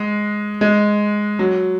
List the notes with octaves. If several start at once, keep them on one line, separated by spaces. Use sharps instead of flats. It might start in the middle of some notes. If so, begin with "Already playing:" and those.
Already playing: G#3
G#3
F#3